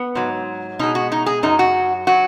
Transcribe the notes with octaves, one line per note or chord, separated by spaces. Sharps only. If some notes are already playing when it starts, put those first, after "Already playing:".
Already playing: B3
G#2 F#3
B2 G#3 D#4
F#4
D#4
G#4
F#2 F#3 D#4
F#4
F#3 F#4